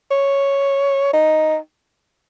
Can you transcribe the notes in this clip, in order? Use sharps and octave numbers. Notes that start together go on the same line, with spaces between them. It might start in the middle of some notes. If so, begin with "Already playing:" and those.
C#5
D#4